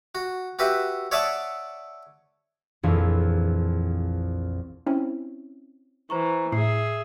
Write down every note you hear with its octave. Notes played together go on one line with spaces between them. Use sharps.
F#4
F#4 G4 B4 E5
C#5 D5 E5 F#5 A5 D#6
A#1 F2 E3 E4 G#4 F5
C4 C#4 E4
E3 C5 A#5 C#6
A2 G#4 E5 C7